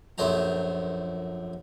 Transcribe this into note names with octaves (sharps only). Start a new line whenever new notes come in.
A#1 F#2 A3 C5 A#5